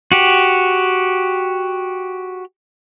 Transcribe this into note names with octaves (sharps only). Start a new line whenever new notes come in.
F#4 G4